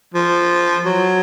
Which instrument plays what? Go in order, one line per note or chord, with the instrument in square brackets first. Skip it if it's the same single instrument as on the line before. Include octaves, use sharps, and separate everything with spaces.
[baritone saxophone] F3
F#3